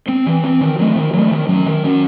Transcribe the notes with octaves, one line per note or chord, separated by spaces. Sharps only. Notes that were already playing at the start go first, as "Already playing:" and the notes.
C4
E3
C4
D#3
F#3 A3
D#3
F#3 A3
D#3
F#3 C#4
D#3
F#3 C#4